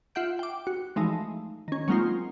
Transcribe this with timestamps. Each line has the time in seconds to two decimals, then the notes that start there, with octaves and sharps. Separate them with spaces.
0.15 F4 E5 F#5 G6 D7
0.39 G5 D6
0.67 F#4
0.96 E3 F3 G#3 A3 D#4
1.68 D#3 C#4
1.88 F#3 G#3 A#3 C4 D#4 F4